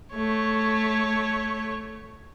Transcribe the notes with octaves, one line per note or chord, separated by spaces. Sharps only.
A3 C#5